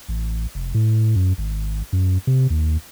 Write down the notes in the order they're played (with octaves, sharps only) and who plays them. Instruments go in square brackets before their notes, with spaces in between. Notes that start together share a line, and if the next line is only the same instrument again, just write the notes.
[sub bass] A1
F1
A2
F#2
G#1
F#2
C3
D#2